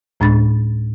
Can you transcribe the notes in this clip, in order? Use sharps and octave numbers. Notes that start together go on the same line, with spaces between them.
D2 A2 G#3 D4 B5 A6